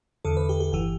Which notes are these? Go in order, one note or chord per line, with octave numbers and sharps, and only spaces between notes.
E2 D3 A4
B4
G4
G4
G1 E3 G4